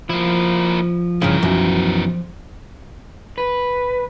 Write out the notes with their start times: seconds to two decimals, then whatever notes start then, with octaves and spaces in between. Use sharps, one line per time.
0.10 F3 A#3 E4
1.22 G2 C#3 E3 A#4
1.42 B1 F#2
3.38 B4